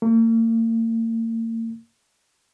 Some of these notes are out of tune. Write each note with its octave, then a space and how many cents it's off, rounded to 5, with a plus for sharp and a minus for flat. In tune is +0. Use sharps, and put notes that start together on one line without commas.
A#3 -45